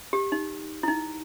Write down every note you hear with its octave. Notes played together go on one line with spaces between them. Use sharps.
G4
D#4
E4
D#4